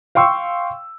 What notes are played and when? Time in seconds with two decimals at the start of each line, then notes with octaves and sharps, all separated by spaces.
0.15 F5 G5 C6 C#6 E6